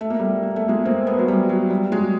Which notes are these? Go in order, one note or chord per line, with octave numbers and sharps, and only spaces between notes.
A3
A#3
G3 A3
A#3
A3
G#3 A#3
A#3 C4
A3 B3
F#3
G3
F#3
G3
F#3 G#3